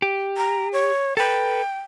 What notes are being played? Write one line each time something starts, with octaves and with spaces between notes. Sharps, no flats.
G4
A#5
C#5
A4 B4 G5